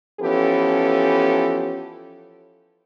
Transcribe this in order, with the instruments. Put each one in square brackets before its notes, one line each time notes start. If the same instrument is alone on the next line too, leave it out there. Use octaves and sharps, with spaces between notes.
[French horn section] E3 F3 B3 C#4 G4 A4